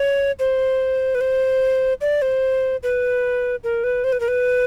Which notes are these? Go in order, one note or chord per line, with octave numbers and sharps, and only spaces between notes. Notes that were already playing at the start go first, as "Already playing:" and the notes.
Already playing: C#5
C5
B4
C5
D5
C5
B4
A#4
B4
C5
B4
A#4
B4